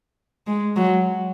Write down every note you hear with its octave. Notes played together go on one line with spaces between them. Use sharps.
G#3
F#3